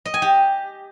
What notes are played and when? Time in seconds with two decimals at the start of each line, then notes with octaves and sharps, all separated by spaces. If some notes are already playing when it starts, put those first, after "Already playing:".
0.06 D#5
0.14 G#5
0.22 G4